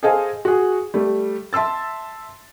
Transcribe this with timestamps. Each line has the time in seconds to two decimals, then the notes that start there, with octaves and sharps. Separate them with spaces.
0.03 G#4 A4 C5 D#5 F5 G#5
0.45 F#4 G#4
0.94 G3 A3
1.53 E5 A5 C6 E6 A6